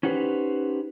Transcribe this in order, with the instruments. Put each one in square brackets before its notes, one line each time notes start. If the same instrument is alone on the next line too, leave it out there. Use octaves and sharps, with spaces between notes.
[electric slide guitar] C#4 D#4 F#4 G4 B4 C5